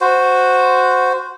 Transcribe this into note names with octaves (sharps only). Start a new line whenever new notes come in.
F#4 C5